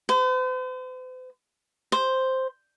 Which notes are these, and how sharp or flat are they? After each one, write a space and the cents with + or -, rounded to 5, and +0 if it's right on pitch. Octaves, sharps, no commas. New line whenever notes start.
C5 -45
C5 +0